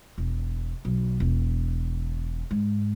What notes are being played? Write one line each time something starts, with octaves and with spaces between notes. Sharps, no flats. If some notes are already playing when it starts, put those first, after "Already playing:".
E1
B1
E1
G#2